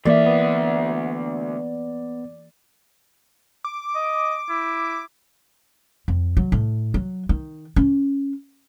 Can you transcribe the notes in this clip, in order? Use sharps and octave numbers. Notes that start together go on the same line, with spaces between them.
D2 E3 A#3 D5 E5
B3
D6
D#5
E4
F2
F#3
A2
F#3
D#3
C#4